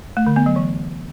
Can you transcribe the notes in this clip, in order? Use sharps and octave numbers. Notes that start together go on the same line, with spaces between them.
A3
D3
B3
F#3
E3